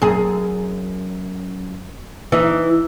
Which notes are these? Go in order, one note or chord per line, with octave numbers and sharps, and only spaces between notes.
F#2 G#4
E3 D#4